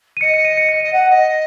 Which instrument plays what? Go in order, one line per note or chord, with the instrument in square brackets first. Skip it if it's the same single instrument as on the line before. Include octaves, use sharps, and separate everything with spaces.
[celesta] D#7
[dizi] D#5 [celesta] C#7
[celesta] C#7
D#7
C#7
C#7
[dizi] D#5 [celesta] D#7
[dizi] F#5
D#5